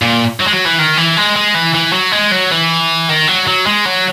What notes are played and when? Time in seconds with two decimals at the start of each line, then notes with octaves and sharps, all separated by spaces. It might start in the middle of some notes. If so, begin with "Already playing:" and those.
0.02 A#2
0.40 F#3
0.47 G#3
0.53 F#3
0.65 E3
0.78 D#3
0.97 E3
1.17 G#3
1.36 G#3
1.55 E3
1.74 E3
1.93 F#3
2.12 G#3
2.32 F#3
2.51 E3
3.09 D#3
3.28 F#3
3.48 F#3
3.66 G#3
3.85 F#3